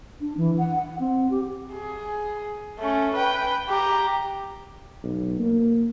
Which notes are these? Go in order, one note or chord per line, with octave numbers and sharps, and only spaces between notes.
D4
E3
F#5
F#5
C4
G4
G#4
A3 C#4
B4 G5
G4 A#5
B1
A#3